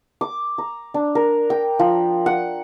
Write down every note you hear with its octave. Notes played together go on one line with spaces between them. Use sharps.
D6
A#5
D4
A#4
G5
F3
F#5